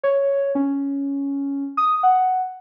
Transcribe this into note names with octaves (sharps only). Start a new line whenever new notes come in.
C#5
C#4
D#6
F#5